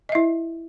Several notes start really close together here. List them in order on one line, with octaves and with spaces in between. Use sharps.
D#5 E5 E4